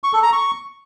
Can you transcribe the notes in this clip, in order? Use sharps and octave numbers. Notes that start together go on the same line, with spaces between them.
C#6
A4
A#5
C#6